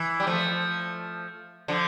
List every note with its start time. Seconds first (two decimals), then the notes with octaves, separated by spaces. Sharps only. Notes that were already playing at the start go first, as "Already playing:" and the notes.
Already playing: E3
0.20 G3
0.27 F3 A3
1.68 D3 F3